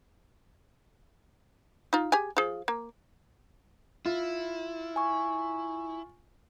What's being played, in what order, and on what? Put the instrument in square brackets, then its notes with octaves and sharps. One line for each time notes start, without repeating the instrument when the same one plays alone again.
[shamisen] D#4 F4
G4 G#4 G#5
F3 G#4
A#3
[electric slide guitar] E4 [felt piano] F4
[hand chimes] G#5 C#6